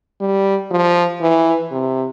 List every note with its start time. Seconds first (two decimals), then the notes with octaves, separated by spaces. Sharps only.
0.21 G3
0.71 F3
1.21 E3
1.71 C3